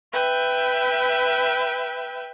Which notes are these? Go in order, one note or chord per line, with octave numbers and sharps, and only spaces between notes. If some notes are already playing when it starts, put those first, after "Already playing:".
B4 E5 G5